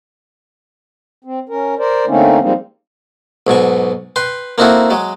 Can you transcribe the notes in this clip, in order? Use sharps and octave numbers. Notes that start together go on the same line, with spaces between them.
C4
C#4 A#4
A#4 C5 D5
D3 A3 A#3 C4 C#4 D#4
F3 G3 G#3 A#3 C4 D#4
B1 G#2 B2 C#6
B4 G5 C6
A#3 C4 D#4 E4 F#4 A4
F#3 G#3